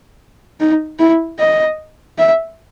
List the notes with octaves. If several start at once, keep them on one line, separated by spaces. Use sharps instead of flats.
D#4
E4
D#5
E5